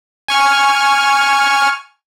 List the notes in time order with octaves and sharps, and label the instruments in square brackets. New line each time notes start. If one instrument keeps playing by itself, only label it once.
[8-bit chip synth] G#5 C#6 F6